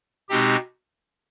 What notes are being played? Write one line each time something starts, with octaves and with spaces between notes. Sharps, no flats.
B2 G#3 C4 D#4 G4